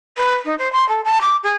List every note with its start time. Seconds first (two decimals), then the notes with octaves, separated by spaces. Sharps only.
0.17 B4
0.45 D#4
0.58 C5
0.72 C6
0.88 A4
1.04 A5
1.21 D6
1.43 G#4